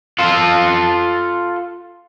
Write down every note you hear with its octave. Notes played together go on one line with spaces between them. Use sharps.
F4 A4